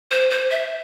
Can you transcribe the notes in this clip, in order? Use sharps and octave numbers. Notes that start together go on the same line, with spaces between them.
C5
C5
E5